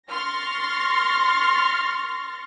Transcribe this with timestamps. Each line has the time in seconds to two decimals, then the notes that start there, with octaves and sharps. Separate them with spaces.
0.11 C6 C#6 F6 A6 A#6